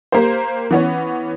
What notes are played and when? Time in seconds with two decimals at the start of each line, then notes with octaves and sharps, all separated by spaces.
0.12 A#3 G4 C5
0.71 E3 B3 C#4